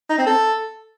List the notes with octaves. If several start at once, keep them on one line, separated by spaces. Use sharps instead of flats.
D#4
C4
A4